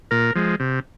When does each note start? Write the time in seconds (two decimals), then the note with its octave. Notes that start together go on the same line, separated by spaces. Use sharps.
0.11 A#2 A#4
0.35 F3 G#3
0.60 C3